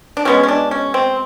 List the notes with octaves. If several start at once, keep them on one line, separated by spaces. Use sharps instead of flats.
D4
B2 G#3 B3 C#4
C#4
D4
C#4
C4